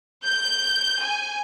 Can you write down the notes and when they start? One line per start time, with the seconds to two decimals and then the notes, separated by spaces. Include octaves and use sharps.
0.25 G6
1.02 G#5